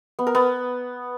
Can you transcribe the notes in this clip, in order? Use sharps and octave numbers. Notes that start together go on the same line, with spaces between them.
B3
A#4
B3